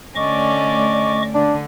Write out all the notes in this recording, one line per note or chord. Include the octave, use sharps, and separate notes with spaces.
D3 A3 C#4 D5 D#5 C#6 D6
D3 D4